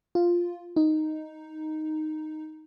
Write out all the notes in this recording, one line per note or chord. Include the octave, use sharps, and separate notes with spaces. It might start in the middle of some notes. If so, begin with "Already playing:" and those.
F4
D#4